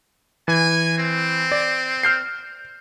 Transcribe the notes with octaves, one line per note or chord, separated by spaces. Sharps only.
E3 G#5
C4
D5
F6 G6 C7